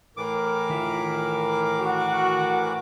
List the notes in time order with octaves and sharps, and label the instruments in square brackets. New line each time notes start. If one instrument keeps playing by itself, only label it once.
[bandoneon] A2 E3 D6 [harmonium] A#4
[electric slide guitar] D#3 E4 F4
[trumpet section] F#4